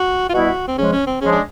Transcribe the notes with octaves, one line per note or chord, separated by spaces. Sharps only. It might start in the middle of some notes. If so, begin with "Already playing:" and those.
Already playing: F#4
F4
B2 G3 B3 E4 F#4
C4
C#3 F3 G#3 C#4
C#4
C4
C#3 F3 G#3 C#4
D4